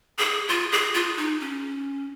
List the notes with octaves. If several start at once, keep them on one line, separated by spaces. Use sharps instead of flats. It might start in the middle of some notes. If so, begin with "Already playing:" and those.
G#4
F4
G#4
F4
D#4
C#4